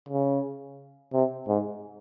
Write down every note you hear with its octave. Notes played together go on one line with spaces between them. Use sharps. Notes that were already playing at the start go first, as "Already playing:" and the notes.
C#3
C3
G#2